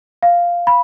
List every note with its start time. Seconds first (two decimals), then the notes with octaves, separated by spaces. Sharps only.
0.23 F5
0.67 B5